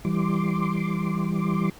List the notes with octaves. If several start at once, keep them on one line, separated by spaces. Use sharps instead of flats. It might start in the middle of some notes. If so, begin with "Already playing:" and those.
E3 G3 C6 D6